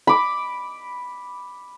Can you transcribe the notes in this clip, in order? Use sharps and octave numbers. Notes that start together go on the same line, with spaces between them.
B5 D6